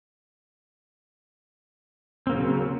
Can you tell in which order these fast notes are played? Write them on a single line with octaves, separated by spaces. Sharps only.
C4 A#3 C#3 F#3